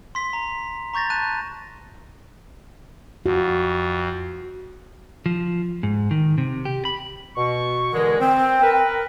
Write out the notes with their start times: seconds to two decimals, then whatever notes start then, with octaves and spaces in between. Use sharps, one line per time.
0.15 C6 B6
0.33 A#5
0.93 A#5 C#6 G6 A6 A#6
1.10 A5 F#6 D#7
3.26 F2 F#4
5.26 F3
5.83 G#2
6.11 D#3
6.38 C3
6.65 G4
6.85 B5
7.35 B2 C#6
7.93 D3 E3 G#3 A#4
8.20 C4 G5
8.62 A#4 B4